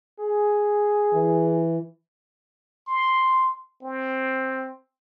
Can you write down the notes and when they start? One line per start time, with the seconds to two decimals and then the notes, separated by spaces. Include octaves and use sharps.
0.20 G#4
1.13 E3
2.88 C6
3.83 C4